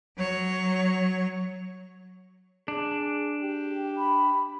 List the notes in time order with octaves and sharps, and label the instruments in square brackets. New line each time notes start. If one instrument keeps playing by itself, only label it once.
[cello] F#3 C#5
[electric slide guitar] D4 [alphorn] G#4
[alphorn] G4
[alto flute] B5